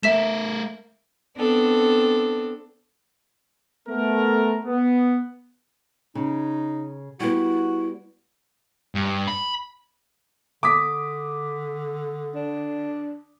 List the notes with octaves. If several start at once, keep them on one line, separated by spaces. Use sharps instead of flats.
A3 A#4 E5 B6 E7
B3 C4 D4 A4
A3 B3 A#4
B3
C#3 D#4
G3 B3 E4 F#4
G2
B5
D3 D6 D#6 B6
D4